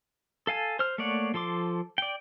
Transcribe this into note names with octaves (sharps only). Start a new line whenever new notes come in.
A4 F5 G#5 A5
C5 F6
A3 A#3 C#5 D5 F#5
F3 A4 C6 D6
D5 G5